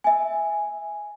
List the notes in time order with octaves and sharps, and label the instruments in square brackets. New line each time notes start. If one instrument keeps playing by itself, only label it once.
[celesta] E5 G#5